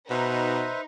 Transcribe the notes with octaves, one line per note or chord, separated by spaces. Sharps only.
B2 D#4 B4 C5 E5